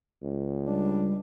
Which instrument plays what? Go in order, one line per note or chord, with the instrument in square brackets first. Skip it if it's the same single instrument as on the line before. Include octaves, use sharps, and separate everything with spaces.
[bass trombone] C#2
[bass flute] G3 [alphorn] D4